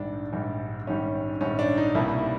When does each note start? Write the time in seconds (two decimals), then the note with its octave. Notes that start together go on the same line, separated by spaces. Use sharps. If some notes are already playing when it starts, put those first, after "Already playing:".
Already playing: A#1 G#2 D#3 G3 D4
0.33 A#1 G#2 D#3 G3
0.87 A#1 G#2 D#3 G3 C#4
1.41 A#1 G#2 D#3 G3 C#4
1.59 D4
1.77 D#4
1.95 C2 B2 G3 A#3 E4